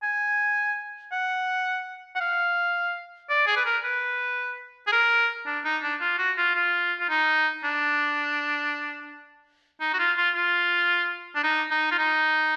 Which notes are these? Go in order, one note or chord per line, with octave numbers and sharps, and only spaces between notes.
G#5
F#5
F#5
F5
D5
G#4
B4
A#4
B4
G#4
A#4
D4
D#4
D4
F4
F#4
F4
F4
F4
D#4
D4
D#4
F#4
F4
F4
F4
D4
D#4
D#4
F4
D#4